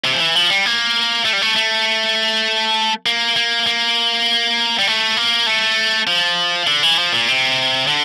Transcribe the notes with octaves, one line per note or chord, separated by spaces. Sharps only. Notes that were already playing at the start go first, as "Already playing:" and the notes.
C3
F3
E3
F3
G3
A#3
A3
G3
A3
A3
A#3
A#3
A#3
G3
A3
A#3
A3
F3
D3
E3
F3
A#2
C3
D3